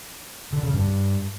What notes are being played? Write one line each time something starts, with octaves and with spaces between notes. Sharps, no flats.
D3
C#3
G2